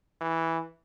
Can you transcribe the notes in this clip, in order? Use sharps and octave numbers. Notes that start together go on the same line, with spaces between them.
E3